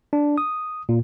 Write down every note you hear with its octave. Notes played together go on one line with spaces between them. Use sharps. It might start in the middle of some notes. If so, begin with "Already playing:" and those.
D4
D#6
A#2